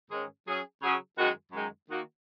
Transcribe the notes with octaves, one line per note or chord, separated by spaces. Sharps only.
G#2 D#3 G#3 C#4 G#4
F#3 C#4 G#4
C#3 F#3 C#4 G#4
F#2 D#3 G#3 F#4
F#2 D#3 G#3 D#4
D#3 A#3 D#4 F#4